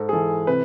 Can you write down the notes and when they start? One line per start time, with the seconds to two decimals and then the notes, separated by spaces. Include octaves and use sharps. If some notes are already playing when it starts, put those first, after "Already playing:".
Already playing: G#2 A4
0.09 G#4
0.13 E3 A4
0.47 C3 B4